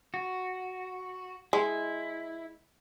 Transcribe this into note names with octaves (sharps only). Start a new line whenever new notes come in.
F#4
G#3 E4